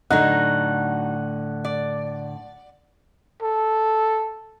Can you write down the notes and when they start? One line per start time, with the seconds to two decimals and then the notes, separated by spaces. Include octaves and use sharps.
0.10 A2 D3 F#3 D4 D#4 F#5
1.65 D5
3.42 A4